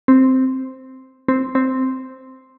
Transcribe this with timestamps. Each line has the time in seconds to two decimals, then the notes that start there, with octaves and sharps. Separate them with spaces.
0.08 C4
1.28 C4
1.55 C4